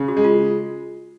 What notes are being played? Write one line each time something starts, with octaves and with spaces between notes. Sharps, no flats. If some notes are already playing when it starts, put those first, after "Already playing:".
Already playing: C#3
F#4
G#3
F4